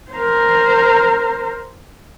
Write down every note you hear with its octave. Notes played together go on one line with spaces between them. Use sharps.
A#4 C5